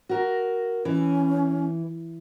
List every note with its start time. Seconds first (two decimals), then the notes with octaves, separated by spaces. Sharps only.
0.09 F#4 A#4
0.85 E3 C#4